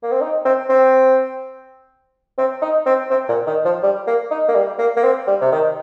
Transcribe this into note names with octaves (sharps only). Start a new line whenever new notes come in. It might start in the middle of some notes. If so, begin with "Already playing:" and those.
A#3
C4
D#4
C4
C4
C4
D#4
C4
C4
A#2
D#3
F3
G3
A#3
D#4
A#3
G3
A#3
A#3
C4
G3
C3
D#3